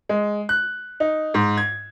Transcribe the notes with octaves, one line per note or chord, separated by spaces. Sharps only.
G#3
F#6
D#4
G#2
G#6